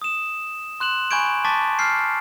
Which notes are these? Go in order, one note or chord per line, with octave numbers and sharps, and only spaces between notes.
D#6 E7
C6 F#6 E7 F#7
G#5 B5 C#6 G6 G#6 D7
A5 C#6 D6 A6 B6
F6 G6 C7